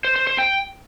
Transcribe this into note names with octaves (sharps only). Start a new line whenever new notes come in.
C5
C5
C5
G5